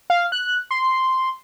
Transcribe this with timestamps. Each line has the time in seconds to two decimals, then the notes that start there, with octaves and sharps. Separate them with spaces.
0.10 F5
0.32 F#6
0.71 C6